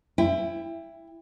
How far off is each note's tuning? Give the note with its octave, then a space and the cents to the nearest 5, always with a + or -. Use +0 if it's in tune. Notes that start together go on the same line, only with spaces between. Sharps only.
E4 +15 G5 +30